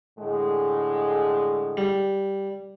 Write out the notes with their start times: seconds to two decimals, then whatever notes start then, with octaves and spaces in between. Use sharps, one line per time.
0.19 A2 D3 G#3
1.77 G3